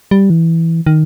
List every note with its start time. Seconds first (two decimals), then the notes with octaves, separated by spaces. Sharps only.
0.11 G3
0.30 E3
0.86 D#3